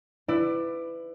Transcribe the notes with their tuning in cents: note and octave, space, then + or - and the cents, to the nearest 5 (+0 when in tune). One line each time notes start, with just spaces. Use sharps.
E4 +10 B4 +25 D5 +20